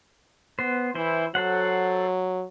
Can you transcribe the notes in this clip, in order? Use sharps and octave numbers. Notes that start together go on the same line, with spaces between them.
B3 C5
E3 E4 C5
F#3 A4 C5 F#5